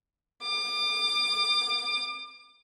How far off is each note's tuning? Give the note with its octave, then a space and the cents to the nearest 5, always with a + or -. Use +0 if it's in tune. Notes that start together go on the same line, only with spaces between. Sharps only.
D6 +35